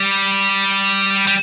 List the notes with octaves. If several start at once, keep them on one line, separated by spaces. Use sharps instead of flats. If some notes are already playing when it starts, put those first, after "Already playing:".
Already playing: G3
G3